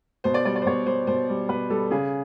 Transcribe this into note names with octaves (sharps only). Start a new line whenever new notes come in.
B2 C5
D5
G3 D5
D5
C5
B2 C#5
G3 C5
B2 C5
G3
B2 B4
G3 A4
C#3 G#4